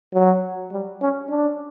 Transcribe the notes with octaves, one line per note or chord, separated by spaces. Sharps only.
F#3
G3
C#4
D4